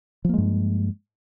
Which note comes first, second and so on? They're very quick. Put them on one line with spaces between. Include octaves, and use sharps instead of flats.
F3 A#3 G#3 G2